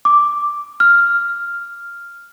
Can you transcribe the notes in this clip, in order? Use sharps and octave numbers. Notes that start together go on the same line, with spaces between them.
D6
F6